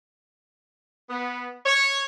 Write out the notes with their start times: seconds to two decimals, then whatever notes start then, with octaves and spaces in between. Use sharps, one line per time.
1.10 B3
1.66 C#5